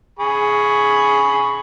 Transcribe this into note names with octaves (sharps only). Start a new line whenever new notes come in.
G#4 B5 C#6